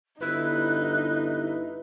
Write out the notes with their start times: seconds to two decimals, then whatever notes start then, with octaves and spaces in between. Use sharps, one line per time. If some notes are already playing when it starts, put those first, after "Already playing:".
0.21 G1 D#4 E4 B4 F#6